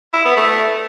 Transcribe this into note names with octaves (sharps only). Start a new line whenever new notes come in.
E4
B3
A3